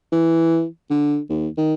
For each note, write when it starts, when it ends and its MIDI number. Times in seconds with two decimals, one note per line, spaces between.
0.12 0.65 52
0.90 1.20 50
1.30 1.48 39
1.58 1.74 51